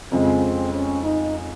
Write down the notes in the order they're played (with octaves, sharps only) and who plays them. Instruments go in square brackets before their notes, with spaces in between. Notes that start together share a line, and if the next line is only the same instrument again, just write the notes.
[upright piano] F2 C#3 G#3 [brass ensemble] C4
[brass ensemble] C#4
D#4